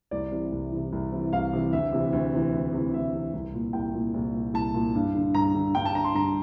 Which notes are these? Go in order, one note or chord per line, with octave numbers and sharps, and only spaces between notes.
C2 D5
C3 E3
C2
C3 E3
C2
C3 E3
C2 F5
C3 E3
D2 E5
C3 E3
D2
C3 E3
D2
C3 E3
D2 E5
C3 E3
C2
A#2
C2 G5
A#2
C2
A#2
C2 A5
A#2
G2
D3
G2 A#5
D3
G2 G5
A5
D3 A#5
C6
G2 A#5